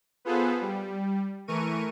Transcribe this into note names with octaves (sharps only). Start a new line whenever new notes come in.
B3 F4 G#4 A4 B4 C5
G3
E3 A3 A#4 C#6 D#7